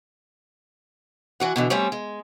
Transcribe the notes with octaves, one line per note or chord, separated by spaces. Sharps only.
E3 F#4 F#5
B2 D3 E3
G3 A3 C4 C#4
G#3